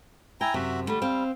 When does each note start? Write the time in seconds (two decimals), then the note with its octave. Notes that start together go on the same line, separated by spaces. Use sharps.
0.41 E4 G5 G#5 A#5
0.54 F#2 C3 F#4 E5
0.88 D3 G3 A3
1.02 C4 F5